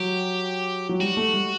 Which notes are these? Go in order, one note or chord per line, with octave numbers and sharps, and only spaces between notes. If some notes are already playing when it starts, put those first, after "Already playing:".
Already playing: F#3 G4
F#3
G3 F#4
A3
G3